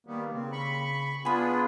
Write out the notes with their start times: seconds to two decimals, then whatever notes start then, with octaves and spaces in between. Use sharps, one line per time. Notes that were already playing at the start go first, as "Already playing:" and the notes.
0.07 D#3 G3 A#3 B3
0.33 C#3 C4
0.52 B5 C#6
1.25 B3 D4 F4 G#4 G#5 B5